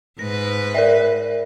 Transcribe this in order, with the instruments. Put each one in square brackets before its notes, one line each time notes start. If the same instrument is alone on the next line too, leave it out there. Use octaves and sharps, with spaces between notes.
[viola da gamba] G#2 B4 [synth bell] A#6
[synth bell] A#4 D5 E5